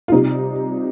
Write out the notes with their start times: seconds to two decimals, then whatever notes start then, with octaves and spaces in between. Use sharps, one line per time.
0.08 F4
0.12 C3 G3 D#4